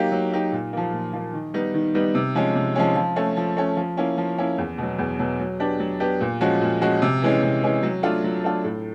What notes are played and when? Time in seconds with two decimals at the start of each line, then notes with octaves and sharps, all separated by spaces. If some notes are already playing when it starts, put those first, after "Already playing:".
Already playing: F#3 A#3 D#4 G4
0.12 F#3
0.32 A#3 D#4 G4
0.52 A#2
0.73 F3 A#3
0.93 A#2
1.13 F3 A#3
1.33 D#3
1.54 G3 B3 D#4
1.74 D#3
1.95 G3 B3 D#4
2.15 C3
2.35 F3 G#3 C#4
2.55 C3
2.76 F3 G#3 C#4
2.96 F3
3.16 A3 C#4
3.37 F3
3.57 A3 C#4
3.77 F3
3.97 A#3 C#4 E4
4.18 F3
4.38 A#3 C#4 E4
4.58 E2
4.78 B2 F#3
4.99 E2
5.19 B2 F#3
5.40 F#3
5.60 B3 D4 G4
5.80 F#3
6.00 B3 D4 G4
6.21 A#2
6.41 F3 G#3 C#4 F#4
6.61 A#2
6.81 F3 G#3 C#4 F#4
7.02 C3
7.22 E3 G#3 C#4
7.42 C3
7.62 E3 G#3 C#4
7.83 F#3
8.03 A3 D4 F4
8.24 F#3
8.44 A3 D4 F4
8.64 A2